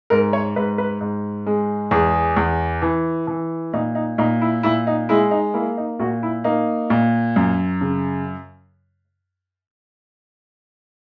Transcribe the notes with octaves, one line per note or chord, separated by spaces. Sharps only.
G#2 A#4
C#5
G#2 B4
B4
G#2
G#3
E2 G#4
E2
E3
E3
A#2 D#4
D#4
A#2 D#4
E4
A#2 E4
D#4
G#3 E4
D#4
A#3 E4
D#4
A#2 F#4
E4
A#3 D#4
A#2
F#2
C#3